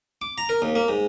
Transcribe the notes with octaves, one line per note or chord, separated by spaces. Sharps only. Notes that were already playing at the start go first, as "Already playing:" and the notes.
D6
A#5
A#4
D#2
A#3
G#2